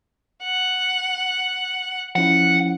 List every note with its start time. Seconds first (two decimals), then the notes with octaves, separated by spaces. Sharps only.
0.43 F#5
2.16 F3 C#4 E4 F#5